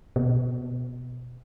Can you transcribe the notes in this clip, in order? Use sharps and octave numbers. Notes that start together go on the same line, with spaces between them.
B2